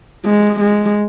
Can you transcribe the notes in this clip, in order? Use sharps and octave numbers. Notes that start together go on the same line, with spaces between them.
G#3
G#3